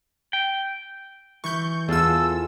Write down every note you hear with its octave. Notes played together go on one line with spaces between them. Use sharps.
G5
E3 C#6 G6
E2 F4 G#4 A4 E6